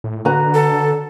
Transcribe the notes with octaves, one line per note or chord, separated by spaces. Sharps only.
A2
D3 F#4 B4 A#5
A4